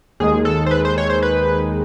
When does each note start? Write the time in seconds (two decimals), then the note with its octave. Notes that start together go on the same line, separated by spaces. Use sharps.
0.20 D#2 D#3 G#3 G#4
0.45 A4
0.66 C5
0.71 B4
0.85 C5
0.98 C#5
1.10 C5
1.22 B4